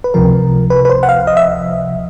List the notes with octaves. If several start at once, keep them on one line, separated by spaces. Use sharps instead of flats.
B4
C#2 C3 F3 A#4
B4
B4
C5
F#5
F5
D#5
E5